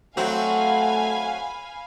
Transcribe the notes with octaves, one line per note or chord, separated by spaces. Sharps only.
F#3 A3 C4 F#4 F5 G#5 B5